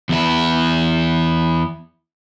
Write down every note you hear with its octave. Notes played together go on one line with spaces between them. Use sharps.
E2 E4